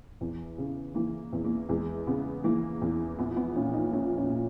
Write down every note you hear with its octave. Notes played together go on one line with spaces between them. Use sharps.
E2
C#3
E3 A#3
E2
A#3
E2 G#3
C#3 B3
E3 A#3
E2
A#1 B3
B3
A#2 C#4
D#4
A#1 C#4
C#4
A#2